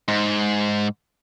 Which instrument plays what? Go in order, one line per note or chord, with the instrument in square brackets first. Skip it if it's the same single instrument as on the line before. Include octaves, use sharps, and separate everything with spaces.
[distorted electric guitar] G#2